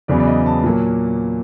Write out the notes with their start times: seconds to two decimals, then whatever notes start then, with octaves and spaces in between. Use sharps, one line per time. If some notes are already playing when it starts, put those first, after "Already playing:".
0.08 E2 C#3 F#3 B3 D5
0.20 D5
0.27 D#5
0.46 A5
0.64 A#2 F#3 A#3